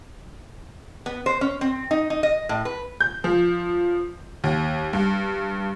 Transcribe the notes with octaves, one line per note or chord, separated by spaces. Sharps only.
B3
C5
C#4
C4
D#4
D#4
D#5
A2
B4
G6
F3
D#2
G2